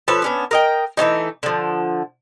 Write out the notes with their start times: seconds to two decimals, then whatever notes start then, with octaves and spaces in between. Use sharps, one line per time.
0.08 F3 A4 B4 C#5
0.22 B3 C#4 D4
0.51 A#4 D#5 G5
0.97 E3 A3 C#4 D#4
1.43 D3 F3